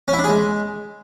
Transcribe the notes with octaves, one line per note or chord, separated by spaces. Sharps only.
C#4
E4
D4
G#4
G#3